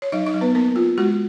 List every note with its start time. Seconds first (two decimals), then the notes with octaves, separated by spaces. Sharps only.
0.02 C#5
0.12 F#3 D#4 D#5
0.26 D#4 D#5
0.34 F#3
0.41 B3 B4
0.55 A#3 B3 A#4
0.76 F4
0.98 G#3 F#4